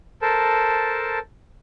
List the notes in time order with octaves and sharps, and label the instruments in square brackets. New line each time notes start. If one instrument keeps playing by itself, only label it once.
[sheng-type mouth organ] A4 A#4 C5 A5